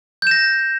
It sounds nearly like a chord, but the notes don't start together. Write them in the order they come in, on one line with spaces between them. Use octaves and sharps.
G6 E7 A#6